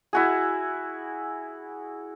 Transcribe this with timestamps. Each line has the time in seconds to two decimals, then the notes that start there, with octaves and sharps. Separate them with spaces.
0.13 E4 F#4 G#4